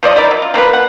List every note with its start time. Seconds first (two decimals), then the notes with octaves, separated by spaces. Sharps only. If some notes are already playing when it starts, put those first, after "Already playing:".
0.03 F3 C5 D5 D#5
0.15 D#4 E4 A#4 D5
0.31 F#3
0.42 F4
0.54 F3 A#3 F4 B4
0.73 F#5